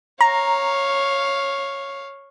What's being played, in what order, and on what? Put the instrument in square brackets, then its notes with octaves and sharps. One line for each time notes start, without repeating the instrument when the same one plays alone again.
[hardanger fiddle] C#5 F5 [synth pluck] A#5